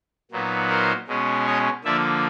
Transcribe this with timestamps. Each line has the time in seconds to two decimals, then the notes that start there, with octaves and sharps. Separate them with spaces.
0.31 A#2 F#3 B3 D#4
0.69 A#4 C5
1.07 B2 G#3 C#4
1.46 C#5 D#5
1.84 D3 F3 A#3 D5 E5